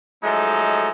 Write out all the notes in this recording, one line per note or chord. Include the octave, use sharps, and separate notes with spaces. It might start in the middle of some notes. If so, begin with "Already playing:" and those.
F3 F#3 G#3 A3 D#4 A4